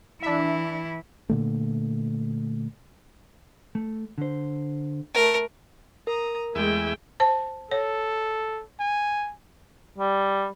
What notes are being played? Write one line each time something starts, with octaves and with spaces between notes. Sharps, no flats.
E3 D4 E4 E5
A#2 D3 A3
A3
D3 C5
A3 A#4
A#4 A#5 D#6
E2 G#3 A3 E5 G5 G#5
C5 A5
A4 C#5
G#5
G3